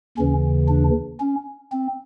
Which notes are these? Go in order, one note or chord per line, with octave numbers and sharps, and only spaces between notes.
D#2 C#3 E3 C#4
D4
C#4
C4